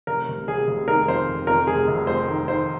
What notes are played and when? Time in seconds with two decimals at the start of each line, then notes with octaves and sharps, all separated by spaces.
0.07 F1 A#4
0.28 F1
0.48 F1 G#4
0.67 F1
0.88 D#3 A#4
1.08 F2 C5
1.28 F1
1.47 F2 A#4
1.67 F1 G#4
1.87 F1
2.07 F2 C5
2.28 D#3
2.48 D#3 C5